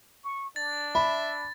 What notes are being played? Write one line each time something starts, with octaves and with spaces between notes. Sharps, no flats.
C#6
D4 A6
E5 B5